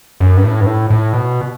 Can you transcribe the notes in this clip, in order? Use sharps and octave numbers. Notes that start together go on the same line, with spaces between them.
F#2
G2
A2
G2
A2
A2
B2